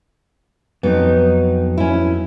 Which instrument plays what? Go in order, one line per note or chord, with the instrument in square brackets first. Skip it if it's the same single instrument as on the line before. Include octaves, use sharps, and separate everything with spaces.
[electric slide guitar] F2 F#3 D#4 [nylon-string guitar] B3
[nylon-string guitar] C#4 E4